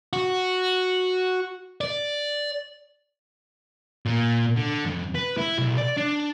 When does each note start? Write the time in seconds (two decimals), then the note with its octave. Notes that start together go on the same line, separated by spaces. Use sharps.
0.13 F#4
1.81 D5
4.06 A#2
4.56 D3
4.86 F2
5.15 B4
5.37 E4
5.58 B1
5.78 D5
5.97 D4